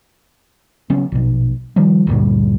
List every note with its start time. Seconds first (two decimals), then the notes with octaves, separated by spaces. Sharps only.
0.90 C#3 F#3 B3 C#4
1.12 A#1 B2
1.76 D#3 F3 G3
2.07 D2 G2 A#2